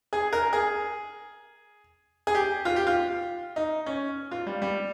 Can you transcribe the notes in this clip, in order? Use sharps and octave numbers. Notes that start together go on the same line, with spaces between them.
G#4
A#4
G#4
G#4
G4
F4
G4
F4
D#4
C#4
F4
G3
G3